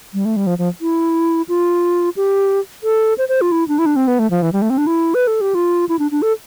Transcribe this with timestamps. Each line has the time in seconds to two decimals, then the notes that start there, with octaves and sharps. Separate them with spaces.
0.14 G3
0.25 A3
0.36 G3
0.47 F3
0.58 F3
0.81 E4
1.49 F4
2.17 G4
2.83 A4
3.18 C5
3.29 C5
3.41 F4
3.52 E4
3.68 D4
3.79 E4
3.86 D4
3.96 C4
4.08 B3
4.19 A3
4.31 F3
4.42 E3
4.53 G3
4.62 A3
4.70 C4
4.78 D4
4.87 E4
5.14 B4
5.27 A4
5.41 G4
5.55 F4
5.89 E4
5.99 D4
6.11 D4
6.22 A4